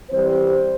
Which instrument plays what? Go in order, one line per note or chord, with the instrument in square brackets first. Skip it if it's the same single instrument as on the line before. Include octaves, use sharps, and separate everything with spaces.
[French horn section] E3 G3 C4 C5